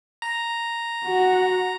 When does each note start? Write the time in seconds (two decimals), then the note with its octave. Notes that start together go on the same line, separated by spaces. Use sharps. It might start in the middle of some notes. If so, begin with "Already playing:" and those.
0.22 A#5
1.05 F#4